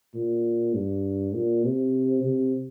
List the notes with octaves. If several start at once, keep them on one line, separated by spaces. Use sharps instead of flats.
A#2
G2
A#2
C3
C3